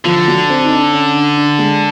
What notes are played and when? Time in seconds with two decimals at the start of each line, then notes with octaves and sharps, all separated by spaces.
0.05 D3 F3
0.28 F#3
0.50 C4
0.65 D#4
0.71 D4
0.92 C#4
1.14 D4
1.37 D4
1.59 G#3